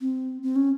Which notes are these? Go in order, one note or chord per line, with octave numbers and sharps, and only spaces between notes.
C4
C4
C#4